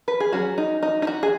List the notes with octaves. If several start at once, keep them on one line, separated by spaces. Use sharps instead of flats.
B4
G#4
F#3 C#4 F#4
D#4
D#4
D#4
F#4
G#4